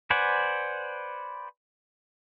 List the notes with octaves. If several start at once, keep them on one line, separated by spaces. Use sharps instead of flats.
B4 C5 D5 F#5 G#5